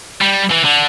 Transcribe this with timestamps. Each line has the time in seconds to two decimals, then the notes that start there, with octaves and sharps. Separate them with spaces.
0.21 G3
0.51 E3
0.65 D3